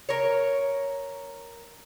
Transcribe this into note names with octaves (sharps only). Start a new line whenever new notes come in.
A#4 C#5